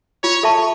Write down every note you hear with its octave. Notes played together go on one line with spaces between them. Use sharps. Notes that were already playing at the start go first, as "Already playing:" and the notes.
F4 C#5
A4 E5 A5 C#6